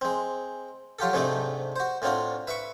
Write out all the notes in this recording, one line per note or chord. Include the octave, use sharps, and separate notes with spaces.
G#3 C4
F#3 F4 G4 A4
G#2 C3 A3 C4 D4 D#4
F#4 C5
A2 C4 D4 F4 F#4
B4 E5 B5 C#6